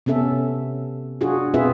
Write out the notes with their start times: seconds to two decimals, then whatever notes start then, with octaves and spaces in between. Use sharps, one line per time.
0.06 C3 B3 C#4 A4 E5
1.21 D4 F4 F#4 G#4
1.54 B2 C4 F4 G#4 B4 E5